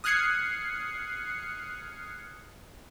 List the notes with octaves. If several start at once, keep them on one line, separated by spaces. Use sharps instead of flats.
D#6 F6 F#6 G#6 C7 C#7